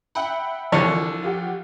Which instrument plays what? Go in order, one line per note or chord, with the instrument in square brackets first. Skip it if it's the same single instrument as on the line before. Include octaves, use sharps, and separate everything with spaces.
[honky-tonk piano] E5 G5 B5 [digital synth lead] F#5
[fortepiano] C2 D3 C#5 [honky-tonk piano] E3 F4 [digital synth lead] F3
[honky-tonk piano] F4 G4 F#5